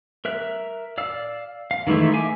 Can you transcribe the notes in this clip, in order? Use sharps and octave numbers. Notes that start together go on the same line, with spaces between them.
A#4 E5 F#6
D5 F5 E6
F5
D#3 E3 G#3 A3 E4
G#3 E5 F5 G#5 D6